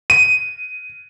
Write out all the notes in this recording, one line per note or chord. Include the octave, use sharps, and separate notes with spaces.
D#7